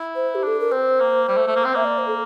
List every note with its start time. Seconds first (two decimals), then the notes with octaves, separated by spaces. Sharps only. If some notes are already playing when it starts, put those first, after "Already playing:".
Already playing: E4
0.16 C5
0.35 G4
0.43 D4 A4
0.60 A#4
0.72 C4 C5
1.00 A#3
1.29 G3
1.37 A3
1.47 A3
1.56 A#3
1.65 C4
1.74 A#3 E5
1.85 D5
1.99 C5
2.07 A4